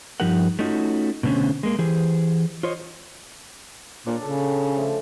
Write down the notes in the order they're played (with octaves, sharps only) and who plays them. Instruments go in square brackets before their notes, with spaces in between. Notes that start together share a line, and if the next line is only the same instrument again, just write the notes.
[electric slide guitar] G2 F3 D#4 G4 A#4 F#5
A3 C#4 D#4 F4 F#4
B2 D3 A3 C4 C#4
G#3 A#3
E3 G4 G#4 C5
F4 C5 C#5 D#5
[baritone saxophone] A#2 [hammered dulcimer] D4 C#5 D5
[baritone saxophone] C#3 [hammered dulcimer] A4
[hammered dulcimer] G5
F3 A3